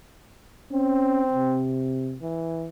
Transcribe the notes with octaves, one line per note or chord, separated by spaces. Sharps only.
C4 C#4
C3
E3